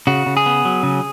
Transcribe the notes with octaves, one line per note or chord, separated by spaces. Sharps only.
C#3 F#4
C#3
G#4
B3
F#3
C#3